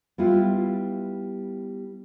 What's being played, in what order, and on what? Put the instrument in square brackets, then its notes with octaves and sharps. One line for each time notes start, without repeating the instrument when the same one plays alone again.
[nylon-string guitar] G3 B3 E4 F4